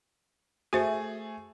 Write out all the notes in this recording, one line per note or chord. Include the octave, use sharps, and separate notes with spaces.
A3 F#4 G#4 C5 E5